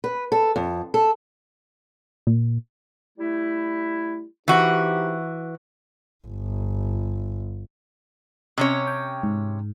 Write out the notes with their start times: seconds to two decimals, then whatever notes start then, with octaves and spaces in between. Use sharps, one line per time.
0.04 B4
0.32 A4
0.56 F2
0.94 A4
2.27 A#2
3.18 G3 A3 E4
4.48 E3 C4 D#4 F#4 G4
6.27 G1
8.58 C3 C#4 C#5
8.87 G5
9.23 G#2